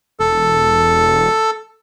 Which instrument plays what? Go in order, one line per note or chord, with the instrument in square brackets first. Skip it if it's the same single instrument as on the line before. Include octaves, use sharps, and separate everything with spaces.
[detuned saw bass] E1 [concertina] A4